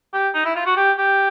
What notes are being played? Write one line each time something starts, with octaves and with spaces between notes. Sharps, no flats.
G4
D#4
E4
F4
F#4
G4
G4